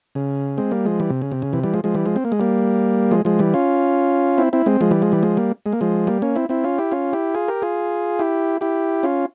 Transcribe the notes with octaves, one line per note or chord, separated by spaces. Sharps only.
C#3
G#3 C4
G3 A#3
F3 G#3
E3 G3
C3
C#3
C3
C#3
C3 E3
E3 G3
F3 G#3
F3 G#3
E3 G3
F3 G#3
C4
A#3
G#3
G3 A#3
F3 G#3
F3 G#3
E3 G3
C#4 F4
C4 E4
C4 E4
G#3 C4
F3 G#3
E3 G3
F3 G#3
E3 G3
F3 G#3
G3 A#3
G#3
A#3
F3 G#3
G3 A#3
A#3 C#4
C4 E4
C4 E4
C#4 F4
E4 G4
C#4 F4
E4 G4
F4 G#4
G4 A#4
F4 G#4
E4 G4
E4 G4
C#4 F4